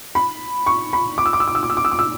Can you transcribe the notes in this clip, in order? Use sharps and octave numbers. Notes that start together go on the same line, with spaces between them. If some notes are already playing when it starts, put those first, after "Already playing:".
B5
C#6
B5
D6
E6
D6
E6
D6
E6
D6
E6
D6
E6
D6
E6